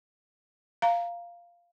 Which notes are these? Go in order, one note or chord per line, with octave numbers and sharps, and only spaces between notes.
F5 A#5